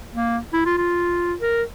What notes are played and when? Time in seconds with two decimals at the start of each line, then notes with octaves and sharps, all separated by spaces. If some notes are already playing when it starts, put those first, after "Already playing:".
0.15 A#3
0.53 E4
0.66 F4
0.78 F4
1.40 A#4